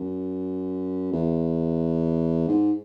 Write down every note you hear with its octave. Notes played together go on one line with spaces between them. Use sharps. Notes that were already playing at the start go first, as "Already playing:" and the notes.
Already playing: F#2
E2
G#2